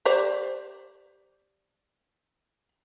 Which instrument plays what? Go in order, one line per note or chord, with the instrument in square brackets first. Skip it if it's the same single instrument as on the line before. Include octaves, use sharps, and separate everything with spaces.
[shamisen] G4 C5 D5